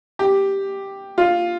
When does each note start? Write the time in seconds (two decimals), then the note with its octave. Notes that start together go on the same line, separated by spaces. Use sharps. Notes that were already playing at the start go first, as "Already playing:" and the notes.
0.19 G4
1.18 F4